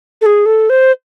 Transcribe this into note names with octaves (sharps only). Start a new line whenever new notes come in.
A4
G#4
A4
C5